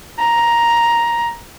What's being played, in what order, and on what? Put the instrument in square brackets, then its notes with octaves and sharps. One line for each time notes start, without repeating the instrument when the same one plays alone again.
[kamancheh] A#5